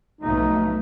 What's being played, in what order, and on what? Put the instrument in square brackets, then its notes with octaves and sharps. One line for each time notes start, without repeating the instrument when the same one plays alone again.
[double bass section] B1 F2 [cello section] A3 [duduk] D#4